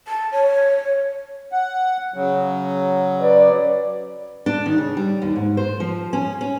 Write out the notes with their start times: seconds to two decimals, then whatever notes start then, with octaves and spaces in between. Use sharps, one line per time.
0.08 A5
0.32 C#5
1.52 F#5
2.14 C#3 F#3
3.20 B4 D5
4.46 D4
4.66 D#3
4.78 C#3
4.97 G3
5.22 D#2
5.36 G#2
5.57 C5
5.80 F3
6.13 C#4
6.41 C#4